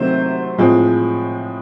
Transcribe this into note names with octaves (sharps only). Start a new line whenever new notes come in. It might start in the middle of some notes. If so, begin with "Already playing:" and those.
Already playing: C3 D#3 F#3 A3 C4 C5
A2 F3 G#3 C4